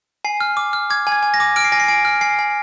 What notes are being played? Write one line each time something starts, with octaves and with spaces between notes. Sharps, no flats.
G#5 C7
F6
D6
F6
D6 G#6
G#5
G#6
G#5
A#6
D6
F6 D7
C7
G#5 A#6
C7
G#5 D7
F6
G#5 C7
G#5